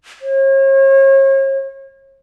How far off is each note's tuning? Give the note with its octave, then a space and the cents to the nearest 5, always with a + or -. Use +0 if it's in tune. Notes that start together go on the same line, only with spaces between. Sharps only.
C#5 -40